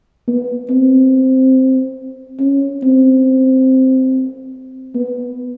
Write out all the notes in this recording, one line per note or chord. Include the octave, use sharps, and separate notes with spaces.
B3
C4
C#4
C4
B3